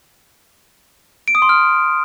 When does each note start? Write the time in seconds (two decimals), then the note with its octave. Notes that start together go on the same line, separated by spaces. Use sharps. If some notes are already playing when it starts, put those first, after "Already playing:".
1.28 D7
1.35 D#6
1.42 C6
1.49 F6